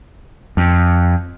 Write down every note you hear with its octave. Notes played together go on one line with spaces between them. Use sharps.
F2